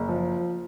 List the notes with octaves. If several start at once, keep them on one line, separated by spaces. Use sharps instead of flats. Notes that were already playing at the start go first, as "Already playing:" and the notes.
Already playing: F#1
F3